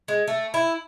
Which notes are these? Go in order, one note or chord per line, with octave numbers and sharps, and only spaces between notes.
G#3
A3
E4